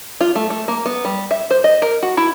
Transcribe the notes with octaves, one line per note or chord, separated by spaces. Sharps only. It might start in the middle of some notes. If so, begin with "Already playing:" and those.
F4
A3
A3
A#3
B3
G3
E5
C5
D#5
A#4
F#4
E4